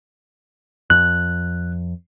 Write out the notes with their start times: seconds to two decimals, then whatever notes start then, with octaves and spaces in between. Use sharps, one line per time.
0.90 F2 F#6